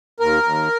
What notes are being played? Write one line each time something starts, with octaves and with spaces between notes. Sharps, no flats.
D#2 A#4
D#2